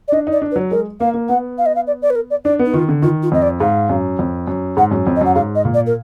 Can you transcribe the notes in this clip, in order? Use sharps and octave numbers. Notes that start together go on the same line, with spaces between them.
D5
D4 D#5
D#4
D5
D4
B4
F#3
G#3 A#4
A#3 F5
A#3
B3 F#5
F5
D#5
F5
D5
D5
B4
A#4
D5
D4 D5
B3
D#4
D#3 F4
D3
D#3 F4
F4
F2 D#5
D5
G#2 F5
F#2
F2
F#2
G#2 F#5
F#2
F2
D#5
F#2 F#5
G#2 F5
D#5
A#2
D5
A#4